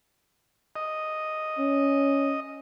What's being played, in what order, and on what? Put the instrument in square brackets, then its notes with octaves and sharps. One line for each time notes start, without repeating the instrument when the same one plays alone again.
[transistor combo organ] D#5
[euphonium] C#4